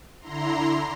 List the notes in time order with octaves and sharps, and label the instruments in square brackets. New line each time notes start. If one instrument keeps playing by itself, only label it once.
[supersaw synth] D3 E4 A#5 C6